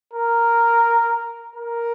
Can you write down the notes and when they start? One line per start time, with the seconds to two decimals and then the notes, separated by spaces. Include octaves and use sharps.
0.13 A#4
1.56 A#4